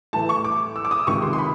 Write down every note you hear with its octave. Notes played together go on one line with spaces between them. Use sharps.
A2 E3 A3 A5
C#6
D6
E6
D6
D#6
C#2 C3 D#3 C#6
C6
C6
B5